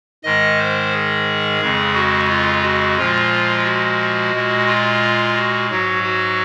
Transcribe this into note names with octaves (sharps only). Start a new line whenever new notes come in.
G#2 D#3 G#3 D#5
C5
G#4
F2 C#3 G#3
F#4
F4
F#4
A#2 F3 G#3 F4
F#4
A#2 G#3
F4
F#4
G#2 F#3 F#4
F#4